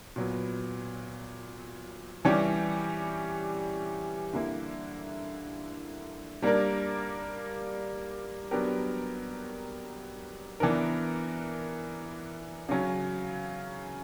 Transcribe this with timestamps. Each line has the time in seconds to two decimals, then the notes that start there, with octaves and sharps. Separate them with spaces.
0.16 A#2 F#3 B3
2.25 E3 G3 C#4 G4
4.33 D3 A#3 E4
6.42 G3 A#3 D4 A#4
8.51 F#3 B3 D4 G4 A#4
10.60 E3 B3 D4 A#4
12.69 C#3 F#3 C#4